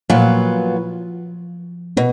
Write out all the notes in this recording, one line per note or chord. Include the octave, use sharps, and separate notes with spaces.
A#2 F3 F#3 B3 F4 B4
B2 B3